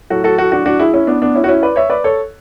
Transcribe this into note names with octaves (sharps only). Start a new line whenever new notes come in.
A2 F#3 F#4 A4
F#4 A4
F#4 A4
D4 F#4
D4 F#4
E4 G#4
C#4 E4
B3 D4
B3 D4
C#4 E4
F#4
C#4 E4
B4 D5
C#5 E5
B4 D5
A4 C#5